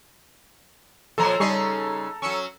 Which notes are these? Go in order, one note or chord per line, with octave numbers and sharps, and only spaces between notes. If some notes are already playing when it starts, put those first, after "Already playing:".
A#2 F3 A4 C5 A#5
C#3 G3 C#4 D#4 C#6 C7
F#3 C#4 C#6 E6 C#7